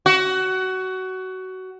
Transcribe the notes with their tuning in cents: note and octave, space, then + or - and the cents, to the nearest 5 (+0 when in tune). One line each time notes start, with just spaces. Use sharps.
F#4 +20